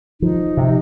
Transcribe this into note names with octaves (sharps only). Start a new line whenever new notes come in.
F3 D#4
C3